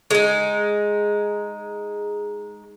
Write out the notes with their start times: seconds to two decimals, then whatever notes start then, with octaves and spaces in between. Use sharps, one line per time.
0.11 G#3 D#4